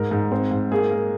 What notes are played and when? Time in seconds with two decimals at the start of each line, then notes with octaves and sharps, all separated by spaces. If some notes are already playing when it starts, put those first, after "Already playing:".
Already playing: G#2 A#4
0.11 G#2
0.32 C4
0.51 G#2
0.71 A#3 G#4
0.91 A#3 A#4